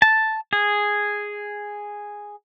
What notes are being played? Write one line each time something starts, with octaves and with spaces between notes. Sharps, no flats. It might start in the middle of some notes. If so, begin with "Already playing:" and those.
A5
G#4